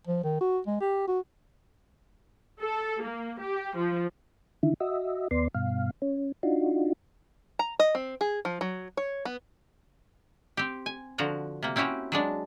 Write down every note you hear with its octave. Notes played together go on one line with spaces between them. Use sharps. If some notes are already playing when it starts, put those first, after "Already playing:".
F3
D#3
F#4
G#3
G4
F#4
A4
A#3
G4
F3
D3 D#3 E4
F#4 D#5 E5
D#2 B3 D5 C6
G2 B2 F5
C#4
D4 D#4 F4 F#4
A#5
D#5
C4
G#4
F3
F#3
C#5
B3
C4 G4
G#5
D3 F3 F#4 A#5
C3 A#3
C4 C#4 E4 F#4 G4 C#5
F#3 G#3 D4